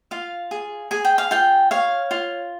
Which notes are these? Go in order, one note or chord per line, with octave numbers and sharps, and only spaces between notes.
F4 F5
G#4
G#4 G#5
G5
F5
F4 G5
C#5 F5
F4